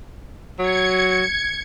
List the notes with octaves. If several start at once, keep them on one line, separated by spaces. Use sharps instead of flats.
F#3 G#6 C#7